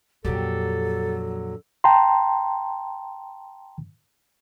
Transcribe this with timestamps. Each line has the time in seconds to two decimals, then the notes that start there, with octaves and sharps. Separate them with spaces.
0.25 F2 A#2 D3 F#3 G4 A4
1.84 G5 A5 A#5 C6